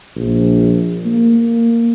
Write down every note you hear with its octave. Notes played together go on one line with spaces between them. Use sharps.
A#1
A#3